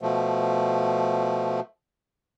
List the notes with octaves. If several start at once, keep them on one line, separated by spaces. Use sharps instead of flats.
B2 F3 A3